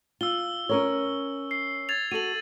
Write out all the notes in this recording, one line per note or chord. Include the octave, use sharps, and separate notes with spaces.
F4 E6 G7
C#4 A#4 C#5
C7
G#6 A6 F7
F#4 A4 D#7 F#7